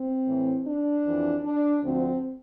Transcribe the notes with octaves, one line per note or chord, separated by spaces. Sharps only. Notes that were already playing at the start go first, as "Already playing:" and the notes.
Already playing: C4
A2 E3
D4
F2 E3
D4
D2 D3 F3 C4